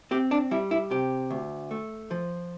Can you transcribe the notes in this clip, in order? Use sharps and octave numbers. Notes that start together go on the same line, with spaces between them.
C4 G4
D4
G3 E4
E4
C3 G4
D2
A3
F3